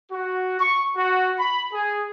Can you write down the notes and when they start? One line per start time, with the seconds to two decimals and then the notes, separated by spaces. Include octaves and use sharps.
0.11 F#4
0.60 C#6
0.96 F#4
1.39 B5
1.73 G#4